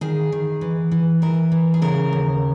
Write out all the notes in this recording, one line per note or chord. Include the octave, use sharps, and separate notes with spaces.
D#3 G#4
D#3
E3
E3
E3 A#4
E3
G#4
C#3 A#4
D#2